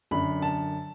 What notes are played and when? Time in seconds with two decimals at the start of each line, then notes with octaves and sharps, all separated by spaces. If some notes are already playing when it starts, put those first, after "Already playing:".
0.11 F#2 D3 B5
0.42 A5